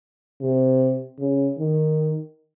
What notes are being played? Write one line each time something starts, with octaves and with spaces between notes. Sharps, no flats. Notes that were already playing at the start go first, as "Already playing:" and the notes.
C3
C#3
D#3